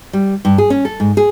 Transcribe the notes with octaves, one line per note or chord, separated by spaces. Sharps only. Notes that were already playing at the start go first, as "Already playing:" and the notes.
G3
G2
G#4
C#4
A4
G#2
G#4